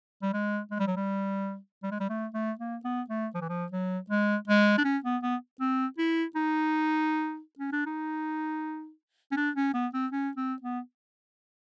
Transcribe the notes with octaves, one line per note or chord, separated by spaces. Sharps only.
G3
G#3
G#3
G3
F#3
G3
G3
G#3
G3
A3
A3
A#3
B3
A3
F3
E3
F3
F#3
G#3
G#3
D4
C#4
B3
B3
C4
E4
D#4
C#4
D4
D#4
C#4
D4
C#4
B3
C4
C#4
C4
B3